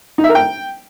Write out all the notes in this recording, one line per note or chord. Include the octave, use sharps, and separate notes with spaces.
D#4
E5
A#4
G5